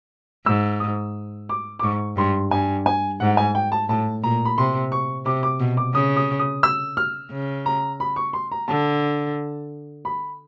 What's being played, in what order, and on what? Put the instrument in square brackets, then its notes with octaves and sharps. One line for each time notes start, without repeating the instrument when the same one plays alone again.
[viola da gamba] G#2 [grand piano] E6
[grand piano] D#6
D6
D6
[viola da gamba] G#2 [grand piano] C#6
[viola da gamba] G2 [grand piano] C6
[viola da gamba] G2 [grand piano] G#5
[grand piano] G#5
[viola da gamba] G#2 [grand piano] F#5
[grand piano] G#5
G5
A5
[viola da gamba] A2 [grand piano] A5
[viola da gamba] A#2 [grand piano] A#5
[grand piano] B5
[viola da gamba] C3 [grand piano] C6
[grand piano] C#6
[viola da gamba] C3 [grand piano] D6
[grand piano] D6
[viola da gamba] B2
[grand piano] D6
[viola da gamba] C#3 [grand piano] D#6
[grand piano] D#6
D#6
E6
F6
[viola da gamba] C#3
[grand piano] A#5
B5
C#6
C6
A#5
[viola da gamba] D3 [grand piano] A5
[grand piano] B5